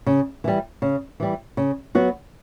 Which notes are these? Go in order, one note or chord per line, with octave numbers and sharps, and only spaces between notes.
C#3
E3 G3
C#3
E3 G3
C#3
F#3 B3 F#4